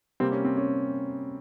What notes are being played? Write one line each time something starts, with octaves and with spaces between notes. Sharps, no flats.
C3 G3 A#3 C4
C#4
C4
C#4